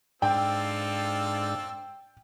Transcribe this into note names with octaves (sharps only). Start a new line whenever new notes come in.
G#2 C4 D4 F4 A4 D5 G5